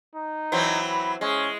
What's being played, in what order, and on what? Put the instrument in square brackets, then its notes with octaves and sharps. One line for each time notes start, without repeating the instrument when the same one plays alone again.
[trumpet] D#4
[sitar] E3 F#3 C4
[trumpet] B5
[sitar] G#3 [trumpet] C#4